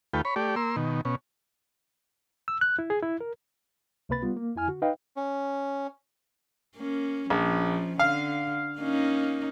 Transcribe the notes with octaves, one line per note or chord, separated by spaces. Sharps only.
D#2 A3 F4 B4 G5
C#5 B5
A3 G4 D5
A#3 C6 E6
B2 D#3
B2 C#4
E6
F#6
E4
G#4
E4
A#4
C#2 C3 A#3 B4 B5 A6
G3 B3 F4
A#3
F2 E4 G#5 F6
D3 F#4
D#4 B4 D#5 F5 G5
C#4
A#3 C#4
A#1 F3 C#4
D3 F5
A#3 C#4 D#4